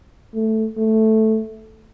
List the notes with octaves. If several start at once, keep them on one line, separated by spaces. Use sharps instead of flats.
A3
A3